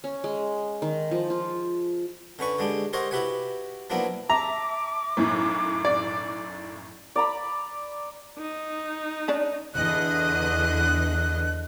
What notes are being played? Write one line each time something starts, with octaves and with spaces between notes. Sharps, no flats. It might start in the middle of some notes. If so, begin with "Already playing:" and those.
C#4
G#3
D#3
F3
F4
D3 C#4 B4 C#6
D3 G#3 D4 G4
G4 A#4 C5 C#5 D#5 F#5
E4 F#4 G4 B4 F#5 G#5
F3 F#3 A#3 B3 D4 E4
E5 A5 A#5 D6
B1 F#2 A2
D5
D5 A#5 B5
D#4
C#4 D4 D5
E2 D3 D#5 F#6